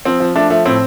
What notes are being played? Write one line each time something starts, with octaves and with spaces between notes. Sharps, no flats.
F3 C4
F3
F3 A3 D4
F3 A3
A2 C4